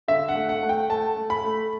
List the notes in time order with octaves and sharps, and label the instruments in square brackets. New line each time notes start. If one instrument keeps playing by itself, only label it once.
[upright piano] D3 E5
F#5
A3
F#5
A3
G5
A3 A5
A3
B5
A3